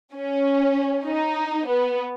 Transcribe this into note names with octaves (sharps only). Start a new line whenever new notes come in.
C#4
D#4
B3